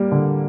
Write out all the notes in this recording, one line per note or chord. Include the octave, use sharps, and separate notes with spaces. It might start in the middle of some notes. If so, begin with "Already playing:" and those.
Already playing: G3 A#3
D3